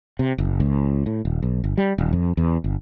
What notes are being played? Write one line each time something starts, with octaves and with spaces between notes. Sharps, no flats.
C3
F#1
C#2
A2
D#1
B1
G1
G3
D#1
F2
E2
G1